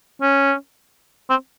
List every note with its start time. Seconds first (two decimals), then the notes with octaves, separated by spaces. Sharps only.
0.21 C#4
1.30 C4